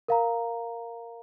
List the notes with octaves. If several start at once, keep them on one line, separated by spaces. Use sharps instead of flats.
A#4 F5 A#5